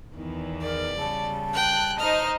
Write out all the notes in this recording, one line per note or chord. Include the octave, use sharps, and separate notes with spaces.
E2 D#3 E3
A#4 D5
C#3 G3 A5
G5 F#6
D#4 C5 D#5 F6